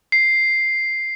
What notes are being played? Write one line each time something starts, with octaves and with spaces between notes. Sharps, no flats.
C7